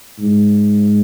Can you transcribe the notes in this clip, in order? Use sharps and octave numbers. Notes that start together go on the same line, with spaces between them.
G#2